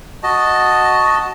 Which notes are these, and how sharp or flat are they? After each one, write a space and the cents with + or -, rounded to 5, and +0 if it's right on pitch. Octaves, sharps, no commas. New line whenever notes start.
F#4 +0 D#5 +0 A5 +0